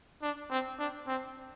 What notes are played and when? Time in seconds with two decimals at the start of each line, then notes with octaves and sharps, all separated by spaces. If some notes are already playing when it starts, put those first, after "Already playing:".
0.22 D4
0.50 C4
0.79 D4
1.08 C4